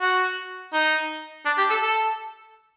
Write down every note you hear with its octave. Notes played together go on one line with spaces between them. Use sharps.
F#4
D#4
D4
G4
A4
A4